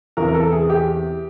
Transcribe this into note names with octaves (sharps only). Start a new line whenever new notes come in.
E2 C3 E3 A#4
A#4
A4
G#4
G4